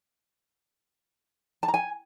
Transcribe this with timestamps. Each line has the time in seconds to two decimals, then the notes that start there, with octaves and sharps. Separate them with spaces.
1.63 A5
1.68 A#5
1.74 G#5